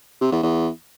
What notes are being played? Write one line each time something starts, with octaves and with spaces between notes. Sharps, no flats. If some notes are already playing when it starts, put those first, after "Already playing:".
C3
E2
E2